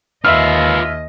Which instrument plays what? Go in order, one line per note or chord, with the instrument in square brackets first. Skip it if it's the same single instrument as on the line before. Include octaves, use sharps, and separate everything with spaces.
[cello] D#2 D#5 [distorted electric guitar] F4 B4 [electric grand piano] E5 E6 F6